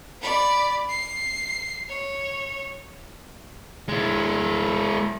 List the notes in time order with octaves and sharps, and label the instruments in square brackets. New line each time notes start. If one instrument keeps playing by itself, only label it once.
[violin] D5 B5
C7
C#5
[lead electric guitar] G#3 E4